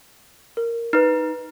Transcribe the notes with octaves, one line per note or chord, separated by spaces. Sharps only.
A#4
D#4 B4 F6